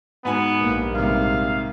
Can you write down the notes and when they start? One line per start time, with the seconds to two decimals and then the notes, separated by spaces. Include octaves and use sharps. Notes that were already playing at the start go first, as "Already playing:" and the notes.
0.25 G#2 B3 F#4 G#5
0.59 A#1 G3 A#3
0.95 G#2 C3 F5